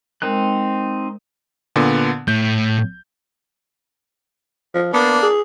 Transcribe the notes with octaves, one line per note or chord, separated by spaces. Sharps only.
G#3 C4 D#4 A#4 F#6
A#2 D3 B3
A2 G6
F3
A#3 B3 D4
G#4